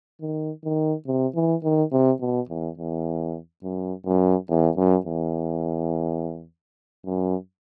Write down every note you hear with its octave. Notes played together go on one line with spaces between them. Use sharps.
D#3
D#3
C3
E3
D#3
C3
B2
E2
E2
F#2
F#2
E2
F#2
E2
F#2